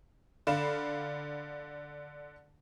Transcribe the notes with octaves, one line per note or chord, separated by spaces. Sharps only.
D3 F5 B5 E7